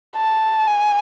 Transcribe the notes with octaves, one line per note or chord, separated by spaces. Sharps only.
A5
G#5